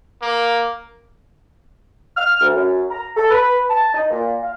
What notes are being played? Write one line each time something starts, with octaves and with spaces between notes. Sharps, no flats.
A#3
F6
D2
F#2
A#5
A4
B4
A5
D#4
A#2
F5